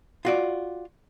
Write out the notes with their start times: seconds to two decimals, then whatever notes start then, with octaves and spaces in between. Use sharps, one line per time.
0.25 F4 F#4 D5